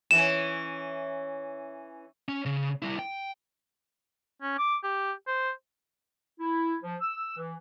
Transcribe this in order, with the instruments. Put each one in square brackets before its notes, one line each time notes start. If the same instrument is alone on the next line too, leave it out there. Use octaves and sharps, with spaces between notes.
[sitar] E3 C#4 [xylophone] E7
[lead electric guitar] C#4
C#3
G3 E4
G5
[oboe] C#4
D6
G4
C5
[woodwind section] E4
F3
E6
E3